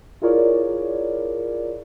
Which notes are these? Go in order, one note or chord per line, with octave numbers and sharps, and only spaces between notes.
E4 F4 G#4 A#4 C#5 D5